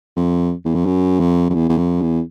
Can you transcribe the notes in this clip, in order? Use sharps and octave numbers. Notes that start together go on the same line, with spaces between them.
F2
E2
F2
F#2
F2
F2
E2
E2
F2
E2